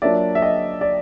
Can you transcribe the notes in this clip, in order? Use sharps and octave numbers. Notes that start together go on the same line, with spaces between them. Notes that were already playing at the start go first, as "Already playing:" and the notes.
F#3 A#3 D4 F4 D5 E5
E5
D#5
D5